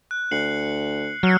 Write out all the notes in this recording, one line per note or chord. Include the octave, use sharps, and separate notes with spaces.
F#6
D2 C7 C#7 F#7
F#3 F6 C#7